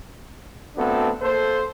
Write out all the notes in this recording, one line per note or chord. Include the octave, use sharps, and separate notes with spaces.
A3 B3 C4 D4 F#4 A4
A#3 A4 C5